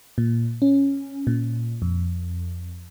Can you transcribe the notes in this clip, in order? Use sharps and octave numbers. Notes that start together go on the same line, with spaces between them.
A#2
C#4
A#2
F2